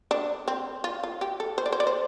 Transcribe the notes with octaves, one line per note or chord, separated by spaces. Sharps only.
D4
C4
F4
F4
G4
A4
C5
D5
C5
D5
C5